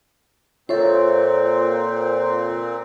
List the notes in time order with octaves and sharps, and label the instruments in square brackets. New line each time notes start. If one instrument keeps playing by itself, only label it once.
[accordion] A#2 C4 [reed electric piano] F4 C#5 E5 [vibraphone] A4 C5